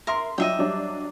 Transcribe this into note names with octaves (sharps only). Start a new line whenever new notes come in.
A#4 E5 C6
F#3 D4 F4 D#5 E5 G5
F#3 G3 D4